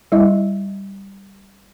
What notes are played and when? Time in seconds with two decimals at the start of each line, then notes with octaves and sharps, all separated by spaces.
0.12 G3 E4 D#5